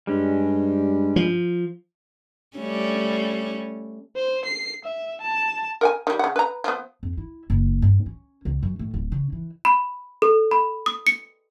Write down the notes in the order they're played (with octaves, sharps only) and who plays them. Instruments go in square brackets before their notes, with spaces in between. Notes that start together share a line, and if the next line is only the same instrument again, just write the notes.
[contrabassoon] G2 [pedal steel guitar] G3 G#3 C#4
[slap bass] F3
[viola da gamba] G3 A3 C#4
[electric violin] C5
C7
E5
A5
[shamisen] A#4 F#5 G#5
D#3 G3
C#3 F#5
B4 A#5
F3 B3
[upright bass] F2
E4
F#1
G2
C#4
C#2
F#2
A2
D1
C#3
E3
[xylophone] B5
A4
B5
D#6
C#7